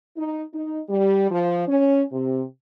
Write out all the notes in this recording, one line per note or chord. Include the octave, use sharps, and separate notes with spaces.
D#4
D#4
G3
F3
C#4
C3